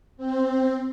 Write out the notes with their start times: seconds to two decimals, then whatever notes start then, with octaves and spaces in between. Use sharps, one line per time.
0.17 C4